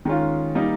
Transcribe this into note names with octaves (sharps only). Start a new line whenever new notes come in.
D#3 G#3 C#4 F4
G3 A#3 D#4